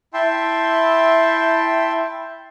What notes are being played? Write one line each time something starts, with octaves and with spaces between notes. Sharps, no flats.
E4 E5 G5 A5 C6